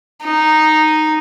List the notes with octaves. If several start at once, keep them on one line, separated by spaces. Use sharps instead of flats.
D#4